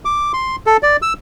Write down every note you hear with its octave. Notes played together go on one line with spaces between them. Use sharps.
D6
C6
A4
D5
E6